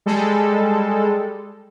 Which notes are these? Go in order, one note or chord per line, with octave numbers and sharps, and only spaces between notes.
G3 G#3 A4